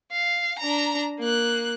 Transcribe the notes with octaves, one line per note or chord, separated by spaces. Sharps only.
F5
D4 A#5
A#3 F#6